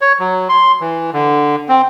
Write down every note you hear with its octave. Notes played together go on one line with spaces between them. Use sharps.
C#5
F#3
C6
E3
D3
C4